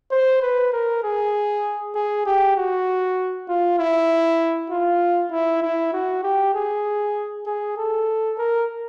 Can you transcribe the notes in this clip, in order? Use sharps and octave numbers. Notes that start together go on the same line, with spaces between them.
C5
B4
A#4
G#4
G#4
G4
F#4
F4
E4
F4
E4
E4
F#4
G4
G#4
G#4
A4
A#4